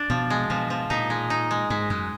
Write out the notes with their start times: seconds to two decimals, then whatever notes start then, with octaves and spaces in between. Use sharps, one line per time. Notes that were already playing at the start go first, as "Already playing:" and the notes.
Already playing: D4
0.10 B2 F3
0.30 G#3
0.50 B2 F3
0.70 F3
0.90 A#2 D#4
1.10 G#3
1.30 D#4
1.51 G#3
1.70 G#2 G#3
1.90 F#2 G#3